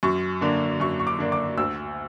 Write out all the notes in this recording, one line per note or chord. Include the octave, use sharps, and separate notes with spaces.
F#2 C#6
D3 A#3 D4
F#2 C#6
C#6
D6
D3 A#3 D4
D6
D2 E6